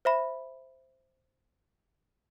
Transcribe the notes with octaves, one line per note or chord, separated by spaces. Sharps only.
C5 E5 B5